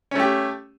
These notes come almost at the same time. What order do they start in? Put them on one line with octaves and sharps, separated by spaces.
C#4 A3 G4